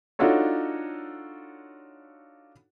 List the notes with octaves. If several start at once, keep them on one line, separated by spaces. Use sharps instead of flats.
D4 D#4 F4 F#4 A4 C#5